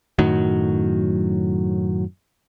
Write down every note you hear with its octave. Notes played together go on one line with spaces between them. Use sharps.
F#2 A2 D#3 F#3